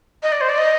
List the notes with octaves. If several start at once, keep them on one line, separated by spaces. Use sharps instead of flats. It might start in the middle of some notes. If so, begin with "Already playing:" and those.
D#5
D5
C5
D5
D#5